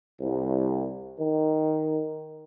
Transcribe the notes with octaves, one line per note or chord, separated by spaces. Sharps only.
C2
D#3